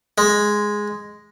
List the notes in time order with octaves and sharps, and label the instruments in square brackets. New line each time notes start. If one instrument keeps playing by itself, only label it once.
[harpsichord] G#3